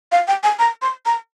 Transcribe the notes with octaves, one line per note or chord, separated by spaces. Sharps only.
F5
G5
G#5
A#5
C6
A#5